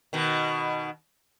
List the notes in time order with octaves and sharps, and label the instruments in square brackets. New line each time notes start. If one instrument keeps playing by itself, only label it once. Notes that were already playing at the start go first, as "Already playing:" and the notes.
[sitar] B2 D#3